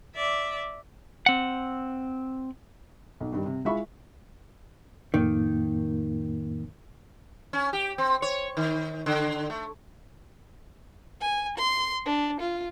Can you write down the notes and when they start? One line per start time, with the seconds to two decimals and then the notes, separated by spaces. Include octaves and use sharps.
0.15 D5 E5
1.26 C4 F#5
3.20 B1
3.33 G2 D#3 G3
3.46 C3
3.65 G#3 E4 F4 E5 B5 C#6
5.14 F2 A2 D#3 A#3
7.53 C#4
7.73 G4
7.98 C4
8.22 C#5
8.57 D#3
9.06 D3
9.50 A3
11.21 G#5
11.58 C6
12.06 D4
12.40 F4